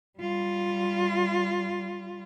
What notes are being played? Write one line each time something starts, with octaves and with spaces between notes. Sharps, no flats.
G3 F4